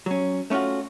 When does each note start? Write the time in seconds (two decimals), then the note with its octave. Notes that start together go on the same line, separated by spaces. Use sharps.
0.06 F#3 C#4
0.50 A3 C#4 D4 F4 F#4